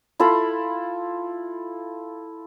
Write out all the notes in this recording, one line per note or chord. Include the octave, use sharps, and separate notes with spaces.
E4 F4 A4 B5